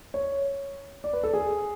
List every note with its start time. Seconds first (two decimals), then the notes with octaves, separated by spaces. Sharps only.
0.14 C#5
1.04 D5
1.13 B4
1.23 A4
1.33 G#4